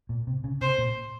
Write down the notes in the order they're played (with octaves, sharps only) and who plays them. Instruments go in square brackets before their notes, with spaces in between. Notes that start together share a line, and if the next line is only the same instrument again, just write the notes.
[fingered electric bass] A#2
C3
C#3
[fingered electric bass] C3 [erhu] C5
[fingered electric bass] A#2